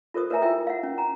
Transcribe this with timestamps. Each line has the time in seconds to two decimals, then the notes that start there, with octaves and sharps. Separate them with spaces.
0.14 F4 A4 A#4 C5 D#6
0.30 A#4 B4 C#5 E5 G#5 A#5
0.42 E4 F4 A#4 E5 G5 E6
0.67 F5 F#5
0.83 C#4
0.98 G#5 A#5